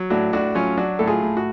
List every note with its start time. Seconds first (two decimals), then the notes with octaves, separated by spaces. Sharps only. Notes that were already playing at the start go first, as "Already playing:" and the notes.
Already playing: F#3
0.10 A2 D4 F#4
0.33 A2 D4 F#4
0.55 F#3 C#4 F4
0.77 F#3 D4 F#4
0.99 A2 A4
1.07 F4 G#4
1.22 A2
1.37 F#4